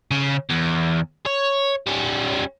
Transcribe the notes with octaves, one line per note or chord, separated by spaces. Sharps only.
C#3
E2
C#5
G3 C#4